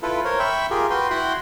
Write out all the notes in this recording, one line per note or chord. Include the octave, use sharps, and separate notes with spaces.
E4 F4 A4 B4
A#4 C5 C#5
E5 G5 B5 C#6 E6
F4 G4 G#4 A#4
F#4 B4 G5 C6
E4 F#4 F#5 G5 B5 C6